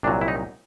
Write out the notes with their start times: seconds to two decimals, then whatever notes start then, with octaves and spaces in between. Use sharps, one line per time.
0.03 C2 A#2 F#3 D4
0.21 E4
0.28 D#4